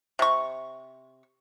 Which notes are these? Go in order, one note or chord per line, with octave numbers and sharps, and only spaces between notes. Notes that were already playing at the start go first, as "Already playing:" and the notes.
C3 C#6